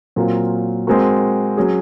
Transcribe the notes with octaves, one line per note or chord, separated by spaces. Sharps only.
A#2 F#3 C4 F4 A#4
G#3 C4 F#4 A#4
F#3 C#4 G#4